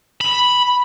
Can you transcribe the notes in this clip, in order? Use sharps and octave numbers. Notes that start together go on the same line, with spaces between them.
B5